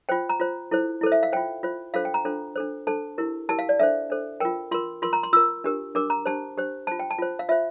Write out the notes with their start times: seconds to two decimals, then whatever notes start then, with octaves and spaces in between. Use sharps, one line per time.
0.09 F4 C5 G5
0.29 A#5
0.40 F4 C5
0.71 E4 A4 C5
1.01 E4 A4 C5
1.12 E5
1.23 F5
1.33 F4 C5 G5
1.63 F4 C5
1.94 D4 F4 A4 C5 F5
2.05 G5
2.14 A#5
2.25 D4 F4 A4 C5
2.55 D4 A4 C5
2.87 D4 A4 C5 A5
3.18 E4 G4 A#4
3.49 E4 G4 A#4 A5
3.59 F5
3.69 D5
3.80 D4 A4 C5 E5
4.10 D4 A4 C5
4.40 F4 A#4 G5
4.71 F4 A#4 C6
5.02 F4 A#4 C6
5.13 A#5
5.23 C6
5.33 F4 A#4 E6
5.64 D4 G4 A#4
5.95 D4 G4 A#4 D6
6.10 A#5
6.26 D4 G4 C5 A5
6.57 D4 G4 C5
6.87 F4 C5 A5
7.00 G5
7.11 A5
7.18 F4 C5
7.39 F5
7.49 F4 C5 E5